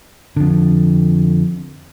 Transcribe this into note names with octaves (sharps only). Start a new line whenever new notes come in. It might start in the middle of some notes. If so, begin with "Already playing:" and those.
F2 D3